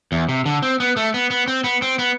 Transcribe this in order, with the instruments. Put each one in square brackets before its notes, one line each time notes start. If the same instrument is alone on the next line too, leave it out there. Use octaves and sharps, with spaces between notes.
[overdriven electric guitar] E2
C3
D3
C4
B3
A3
B3
B3
C4
B3
C4
B3